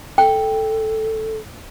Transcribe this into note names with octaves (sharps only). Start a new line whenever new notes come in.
A4 G5